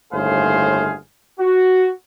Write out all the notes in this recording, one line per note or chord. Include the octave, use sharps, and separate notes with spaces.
G1 D#2 A2 G#4 C5 F5
F#4